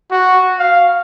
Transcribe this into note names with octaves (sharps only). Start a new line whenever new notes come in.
F#4
F5